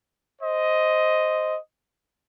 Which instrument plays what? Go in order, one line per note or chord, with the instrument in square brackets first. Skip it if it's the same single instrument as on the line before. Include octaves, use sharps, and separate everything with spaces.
[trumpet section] C5 D#5